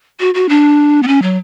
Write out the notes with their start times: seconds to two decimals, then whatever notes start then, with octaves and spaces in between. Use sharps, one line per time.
0.20 F#4
0.35 F#4
0.49 D4
1.03 B3
1.08 C#4
1.22 F#3